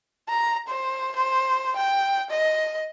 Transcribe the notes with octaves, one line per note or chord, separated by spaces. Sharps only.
A#5
C5
C5
G5
D#5